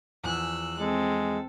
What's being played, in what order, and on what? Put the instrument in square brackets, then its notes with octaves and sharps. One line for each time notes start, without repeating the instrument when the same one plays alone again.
[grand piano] E2 F3 G#5 [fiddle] E6 F#6
[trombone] G#3 [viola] C4 [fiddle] A4